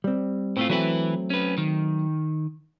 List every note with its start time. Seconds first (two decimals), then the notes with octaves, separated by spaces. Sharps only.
0.04 G3 C4
0.57 A2 A3 C4 F4
0.70 E3 F#3 A3 C4 E4 B4
1.30 C#4 B4
1.58 D#3